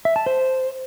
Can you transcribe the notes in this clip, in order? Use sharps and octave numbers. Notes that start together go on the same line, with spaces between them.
E5
A5
C5